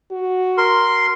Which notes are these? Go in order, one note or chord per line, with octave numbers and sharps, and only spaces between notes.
F#4
A#4 C6